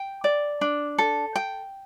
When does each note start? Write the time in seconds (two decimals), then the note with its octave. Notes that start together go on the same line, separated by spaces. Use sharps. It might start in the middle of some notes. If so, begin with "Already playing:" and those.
Already playing: G5
0.24 D5
0.61 D4
0.98 A4
1.36 G5